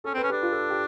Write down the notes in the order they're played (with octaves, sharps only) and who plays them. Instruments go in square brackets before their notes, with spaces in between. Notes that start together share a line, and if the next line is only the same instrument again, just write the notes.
[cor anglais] C#4 [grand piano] A4
[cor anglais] C4 [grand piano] B4
[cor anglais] C#4
[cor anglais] D4 [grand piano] G4
[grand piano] F4
A4
G4